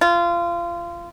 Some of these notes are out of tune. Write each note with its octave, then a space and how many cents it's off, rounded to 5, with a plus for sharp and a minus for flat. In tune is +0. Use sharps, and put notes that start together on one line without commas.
F4 -25